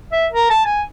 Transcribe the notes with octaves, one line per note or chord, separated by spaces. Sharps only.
E5
A#4
A5
G#5